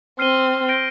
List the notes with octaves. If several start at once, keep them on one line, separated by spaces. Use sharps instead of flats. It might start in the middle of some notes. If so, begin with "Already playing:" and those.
C4 F6 C7 D#7 G7
G6 A#6 D7 G7